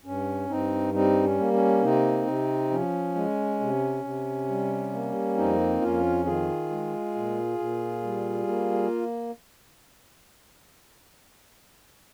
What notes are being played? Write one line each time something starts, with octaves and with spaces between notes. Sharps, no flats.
G2 C#4
G2 C4 D#4
G3 C4 D#4
C#4
A#3
C#4
C3 C4 D#4
C3
F3 C#4
G#3
C3
C3
G3
A#3
F2 C4 D#4
F2 C#4 F4
D#3 F4 G#4
G#3
A#2
A#2
G3
A#3